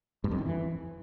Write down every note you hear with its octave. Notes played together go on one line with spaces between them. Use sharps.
G2
F2
D#3
E3